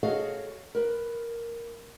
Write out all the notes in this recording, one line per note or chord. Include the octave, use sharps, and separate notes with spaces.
F#4 G#4 A4 C#5 D#5 F5
A#4 B4